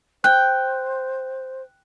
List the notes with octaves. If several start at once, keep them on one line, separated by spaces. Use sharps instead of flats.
C5 G5 F#6